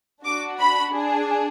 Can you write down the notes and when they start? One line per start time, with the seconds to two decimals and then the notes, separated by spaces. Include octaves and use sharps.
0.24 D4 F#4 D6
0.59 B5
0.93 D4 G#4